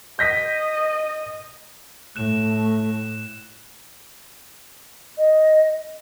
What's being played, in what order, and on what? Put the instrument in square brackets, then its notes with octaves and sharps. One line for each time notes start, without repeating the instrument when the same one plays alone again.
[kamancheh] D#5 [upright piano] G6 A#6 B6
[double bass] A2 [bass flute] A3 [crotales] F#6 E7
[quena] D#5